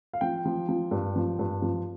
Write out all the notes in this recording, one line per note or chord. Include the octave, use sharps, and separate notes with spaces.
F5
F3 G5
F3
F3
G2
F3
G2
F3